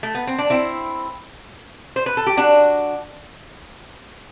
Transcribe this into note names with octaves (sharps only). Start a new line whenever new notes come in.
A3
B3
C4
D4
C4 E4
C5
B4
A4
G4
D4 F#4